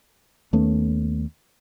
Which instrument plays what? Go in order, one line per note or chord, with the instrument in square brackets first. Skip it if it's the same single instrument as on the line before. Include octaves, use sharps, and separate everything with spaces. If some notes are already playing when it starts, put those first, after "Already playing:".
[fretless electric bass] D#2 A3 B3 C#4